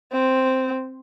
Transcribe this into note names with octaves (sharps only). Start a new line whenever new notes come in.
C4